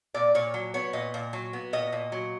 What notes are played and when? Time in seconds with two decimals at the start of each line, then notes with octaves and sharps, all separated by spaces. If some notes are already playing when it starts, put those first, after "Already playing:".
0.14 A#2 D5
0.35 A#2 C#5
0.54 F#3
0.74 B3 C#5
0.93 A#2 D#5
1.14 A#2
1.33 F#3
1.53 B3
1.73 A#2 D#5
1.92 A#2
2.12 F#3